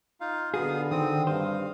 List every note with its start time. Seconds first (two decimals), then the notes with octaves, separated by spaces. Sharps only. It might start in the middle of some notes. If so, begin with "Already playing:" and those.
0.21 D#4 F4 F5
0.54 D3 B3 F#4 G#4 F5 D#6
0.91 D#3 C4 D#6
1.27 G2 C5 F5